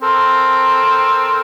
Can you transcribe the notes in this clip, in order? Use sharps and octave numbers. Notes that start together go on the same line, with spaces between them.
C4 A4 A#4